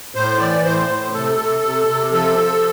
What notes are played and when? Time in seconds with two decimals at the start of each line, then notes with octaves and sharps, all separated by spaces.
0.15 A2 C5
0.39 E3 D5
0.64 A2 C5
0.89 A2
1.14 C3 A4
1.38 C3
1.64 C3
1.88 C3
2.12 F3 A4
2.37 F3